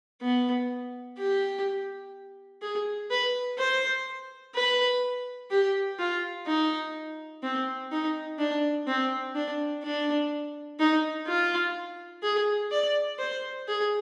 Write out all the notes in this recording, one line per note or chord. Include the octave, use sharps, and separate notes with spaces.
B3
G4
G#4
B4
C5
B4
G4
F4
D#4
C4
D#4
D4
C4
D4
D4
D#4
F4
G#4
D5
C5
G#4